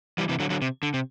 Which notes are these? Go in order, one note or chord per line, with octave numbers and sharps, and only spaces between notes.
E3 G3
C3 E3
D3 F#3
D3 F#3
C3
D3
C3